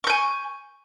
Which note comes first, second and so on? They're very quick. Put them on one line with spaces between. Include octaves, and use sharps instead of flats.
C#6 G6 G#5